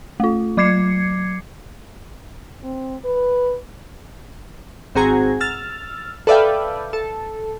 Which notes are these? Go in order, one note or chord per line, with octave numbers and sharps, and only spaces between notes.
A3 F4
F#3 D6 G#6 C7 C#7
C4
B4
G#1 C4 F#4 G#4 A#5 G#6
E6 F6 A6
A4 B4 D5 E5 F5 G5
A4